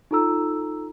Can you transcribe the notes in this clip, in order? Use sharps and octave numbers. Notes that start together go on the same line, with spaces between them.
D#4 F4 A4 A#5 E6